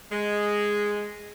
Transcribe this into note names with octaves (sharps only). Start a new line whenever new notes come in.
G#3